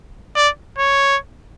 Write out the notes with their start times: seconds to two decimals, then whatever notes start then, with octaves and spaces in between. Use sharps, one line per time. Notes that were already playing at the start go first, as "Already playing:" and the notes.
0.35 D5
0.78 C#5